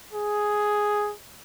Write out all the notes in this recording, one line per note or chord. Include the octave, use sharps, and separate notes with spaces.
G#4